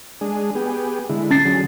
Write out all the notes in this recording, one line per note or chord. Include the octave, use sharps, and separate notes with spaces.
G#3 D4 G#4
B3 G4 G#4
D3 G#3 E4
C#4 A6 C7
D3 F#3 G#4